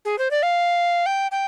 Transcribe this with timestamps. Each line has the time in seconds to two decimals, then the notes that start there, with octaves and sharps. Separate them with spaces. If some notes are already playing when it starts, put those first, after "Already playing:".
0.05 G#4
0.19 C5
0.31 D5
0.43 F5
1.06 G5
1.31 G5